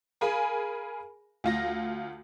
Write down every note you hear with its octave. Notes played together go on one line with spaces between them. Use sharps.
G#4 A#4 F5 G#5 B5
D2 F4 A#6